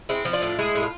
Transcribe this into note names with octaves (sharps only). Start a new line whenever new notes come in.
G#3 C4 E4
F3
D4 F4
A2
G#3 E4 G#4
A2
F4